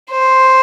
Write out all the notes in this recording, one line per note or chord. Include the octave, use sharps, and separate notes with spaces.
C5